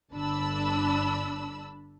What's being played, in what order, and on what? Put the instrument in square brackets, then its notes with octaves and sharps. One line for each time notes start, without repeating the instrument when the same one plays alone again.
[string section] G1 D4 A5 B5 E6